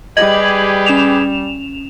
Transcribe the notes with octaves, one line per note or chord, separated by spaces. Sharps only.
G3 G4 G#4 B4 D#5 G#6 F#7
C#4 E7 F7